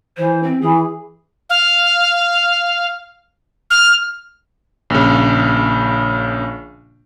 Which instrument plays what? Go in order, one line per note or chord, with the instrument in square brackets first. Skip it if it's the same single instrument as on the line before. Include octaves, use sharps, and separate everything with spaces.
[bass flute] E3 [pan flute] C5
[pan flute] C4
[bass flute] E3 [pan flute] G#4
[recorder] F5
F6
[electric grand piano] A#1 C#3